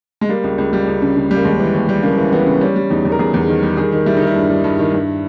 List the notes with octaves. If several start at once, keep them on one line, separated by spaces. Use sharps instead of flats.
G#3
G3 A#3
C#2
C#2
G3
C#2
C#3
C#3
G3
A#3
D#2 G#3
E3
D#2
G3
C#3 A#3
E3
E3 B3
C#3
G3 C#4
G3
E2 D#4
E2
A#4
E2 G#4
E2
D#3
G3
D#3 G#4
D#3
G3 E4
D#3 D#4
E4
G2
G3
G2
D#3
G2